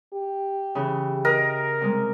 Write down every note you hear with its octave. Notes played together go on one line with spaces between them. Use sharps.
G4
C#3 E3
A#4 D#5
C3 G3 G#3